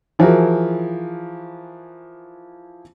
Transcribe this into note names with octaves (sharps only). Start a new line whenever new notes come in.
E3 F3 E4 F#4 G#4 A#4